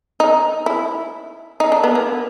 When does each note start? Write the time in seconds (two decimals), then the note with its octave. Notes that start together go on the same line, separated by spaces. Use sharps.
0.20 D#4
0.66 E4
1.60 D#4
1.72 D4
1.84 B3
1.95 A#3